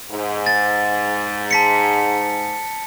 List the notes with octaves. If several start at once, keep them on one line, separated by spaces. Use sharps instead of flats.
G#2
A6
A5 B6 C#7